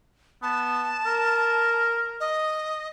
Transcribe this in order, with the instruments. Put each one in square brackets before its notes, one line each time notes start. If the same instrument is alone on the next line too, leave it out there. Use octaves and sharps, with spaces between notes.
[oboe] B3 [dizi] A5
[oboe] A#4
[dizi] D#5